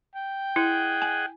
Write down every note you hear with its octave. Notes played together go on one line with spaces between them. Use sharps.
G5
E4 G#4 D#5 F#5
G#5